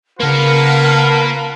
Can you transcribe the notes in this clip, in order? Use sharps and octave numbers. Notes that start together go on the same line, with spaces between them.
C#3 A#3 F4 A#4 B4 F#5 A5 F6